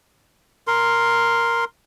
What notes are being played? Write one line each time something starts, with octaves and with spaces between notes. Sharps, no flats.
A#4 C6